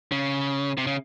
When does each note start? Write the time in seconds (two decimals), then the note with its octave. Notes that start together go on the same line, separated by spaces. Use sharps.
0.12 C#3
0.78 C3
0.87 C#3